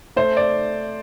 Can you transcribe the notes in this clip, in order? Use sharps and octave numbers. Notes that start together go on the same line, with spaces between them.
A3 C5
D5